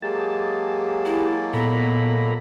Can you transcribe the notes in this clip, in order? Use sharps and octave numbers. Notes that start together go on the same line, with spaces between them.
F#3 G#3 A#3 G4 G#4 A5
E4
A#2 B3 A4 A#5 B5